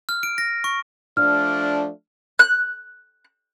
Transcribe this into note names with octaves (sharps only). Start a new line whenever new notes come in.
F6
D7
A#6
C#6
F3 A3 D4 F6
F#6